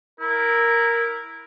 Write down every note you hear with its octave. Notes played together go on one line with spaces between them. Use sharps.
E4 A#4